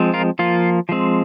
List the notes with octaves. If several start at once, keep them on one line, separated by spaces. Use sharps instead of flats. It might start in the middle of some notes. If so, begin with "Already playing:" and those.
Already playing: F3 G#3 C4
F4 A#4
F3 A#3 F4
F3 G#3 C4